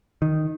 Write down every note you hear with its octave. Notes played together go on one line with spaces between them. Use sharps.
D#3